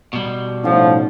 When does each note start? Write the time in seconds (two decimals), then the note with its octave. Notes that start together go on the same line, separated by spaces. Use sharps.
0.13 B2 G3
0.64 A2 F3 C#4 D#4 F#5